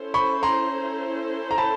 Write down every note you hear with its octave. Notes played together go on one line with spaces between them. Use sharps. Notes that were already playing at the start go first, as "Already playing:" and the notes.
Already playing: C#4 E4 A4 C5
B5 C#6
A#5 C6
A#5
A5 B5